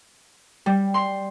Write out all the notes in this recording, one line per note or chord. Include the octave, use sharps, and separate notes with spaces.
G3
C6